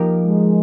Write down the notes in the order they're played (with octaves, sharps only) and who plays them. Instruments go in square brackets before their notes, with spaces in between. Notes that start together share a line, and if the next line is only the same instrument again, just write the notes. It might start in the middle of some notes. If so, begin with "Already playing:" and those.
Already playing: [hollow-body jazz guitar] F3 A#3 D#4 G4 A#4
[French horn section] G#3